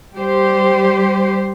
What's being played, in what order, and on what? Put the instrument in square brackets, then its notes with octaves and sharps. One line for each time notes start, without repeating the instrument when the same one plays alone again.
[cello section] G3 G4 C5